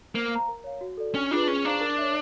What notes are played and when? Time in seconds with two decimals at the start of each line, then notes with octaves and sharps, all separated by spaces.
0.15 A#3 C5
0.31 F5 A#5
0.48 A#4
0.64 C#5 F5
0.81 F#4
0.97 A4 D5
1.14 C#4 D4
1.31 D4 F4 G#4 B4
1.47 C#4 G#4
1.64 D4 C5 F5 A#5 C#6
1.81 A#4
1.98 C#5 E5